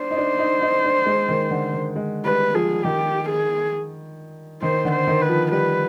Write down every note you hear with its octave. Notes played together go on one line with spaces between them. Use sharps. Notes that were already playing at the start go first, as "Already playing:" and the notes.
Already playing: D4 C5
D#4
D4
D#4
D#4
D4
G#3
D#3
D3
D#3
G#3
G3 B4
F3 G#4
D#3 G4
G#4
D#3 C5
D3
C5
D#3
B4
F3
G3 B4